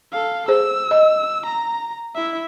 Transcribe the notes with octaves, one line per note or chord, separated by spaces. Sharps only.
A4 F5
G#4 C5 E6
D#5
A#5
E4 E5